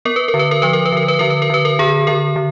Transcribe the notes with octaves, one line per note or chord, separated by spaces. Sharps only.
B3 A#4
B4
A#4
D3
B4
A#4
F3 B4
A#4
B4
D3 A#4
B4
D3 A#4
B4
A#4
D3 B4
A#4
D3 G#4
D3 A#4
D3